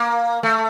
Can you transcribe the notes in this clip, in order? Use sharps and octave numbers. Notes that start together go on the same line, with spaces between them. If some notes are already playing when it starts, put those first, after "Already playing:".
Already playing: A#3
A3